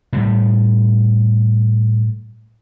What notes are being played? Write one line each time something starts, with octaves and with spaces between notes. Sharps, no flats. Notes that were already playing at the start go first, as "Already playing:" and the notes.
A2 G3